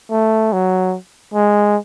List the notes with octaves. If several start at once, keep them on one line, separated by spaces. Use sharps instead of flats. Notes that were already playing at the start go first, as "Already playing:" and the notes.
A3
F#3
G#3